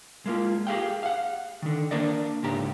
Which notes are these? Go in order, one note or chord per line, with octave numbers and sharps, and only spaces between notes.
G#3 A#3 F4
G4 G#4 F5 G5
F5 F#5
D3 D#3
A#3 D4 A#4 D5 D#5
C#2 G#2 G4 A#5